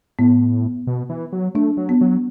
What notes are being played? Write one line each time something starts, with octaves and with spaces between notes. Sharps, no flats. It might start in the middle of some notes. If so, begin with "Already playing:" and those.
A2 B3
B2
E3
F#3
A3 D4
F#3
B3
F#3